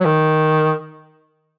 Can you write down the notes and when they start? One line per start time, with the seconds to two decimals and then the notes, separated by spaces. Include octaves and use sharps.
0.01 F#3
0.06 D#3